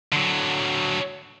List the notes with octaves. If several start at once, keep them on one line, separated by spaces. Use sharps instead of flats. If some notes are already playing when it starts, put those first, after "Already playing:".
D3 F#3